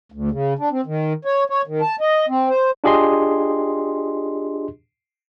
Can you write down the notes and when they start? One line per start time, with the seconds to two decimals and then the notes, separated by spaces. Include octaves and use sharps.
0.12 D2
0.31 C#3
0.59 D4
0.71 C4
0.86 D#3
1.25 C#5
1.50 C#5
1.67 D#3
1.81 A5
2.01 D#5
2.29 C4
2.50 C5
2.84 D4 F4 G4 G#4 D#5 C6